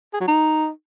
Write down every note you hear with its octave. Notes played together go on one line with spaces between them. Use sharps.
G#4
F#3
D#4